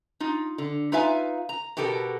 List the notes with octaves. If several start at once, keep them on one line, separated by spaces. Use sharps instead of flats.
D#4 F4
D3
D#4 F4 B4 E5 F5 G#5
A#5
B2 B3 G4 A4 A#4